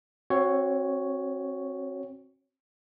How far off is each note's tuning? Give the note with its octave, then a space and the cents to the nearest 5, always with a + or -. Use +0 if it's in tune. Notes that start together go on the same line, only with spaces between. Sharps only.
C4 +30 F#4 +0 C#5 +5